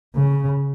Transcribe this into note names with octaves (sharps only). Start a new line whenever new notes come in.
C#3